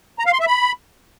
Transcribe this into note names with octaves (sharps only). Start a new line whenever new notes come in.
A#5
F5
C6
E5
B5